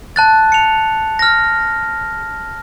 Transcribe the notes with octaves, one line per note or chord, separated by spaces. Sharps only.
A5 F#6 A6
C#7 F7
F6 A#6